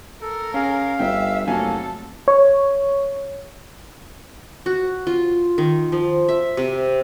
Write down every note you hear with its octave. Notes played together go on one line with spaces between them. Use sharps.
A4 A#4
C#4 G#4 F5
G1 E5 G5
F1 F#3 A#3 A4 F5 G#5
C#5
F#4
F4
D#3
F3
E5
C3